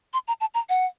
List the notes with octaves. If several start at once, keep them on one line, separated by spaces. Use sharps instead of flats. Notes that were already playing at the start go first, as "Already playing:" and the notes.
C6
A#5
A5
A#5
F#5